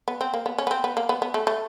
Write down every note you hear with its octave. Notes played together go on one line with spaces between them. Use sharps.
B3
C4
A#3
B3
C#4
B3
C4
B3
A#3
B3
B3
A3
A3